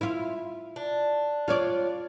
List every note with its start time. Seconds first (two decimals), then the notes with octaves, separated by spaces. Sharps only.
0.01 E4 F4
0.76 D4
1.48 F4 C#5 D5